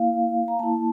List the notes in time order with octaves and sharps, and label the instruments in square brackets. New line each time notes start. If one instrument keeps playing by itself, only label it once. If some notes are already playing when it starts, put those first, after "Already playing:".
Already playing: [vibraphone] A#3 E4 F5
A#5
A#3 E4 A5